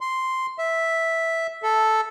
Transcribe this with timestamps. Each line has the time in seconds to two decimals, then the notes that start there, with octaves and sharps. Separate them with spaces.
0.01 C6
0.59 E5
1.63 A4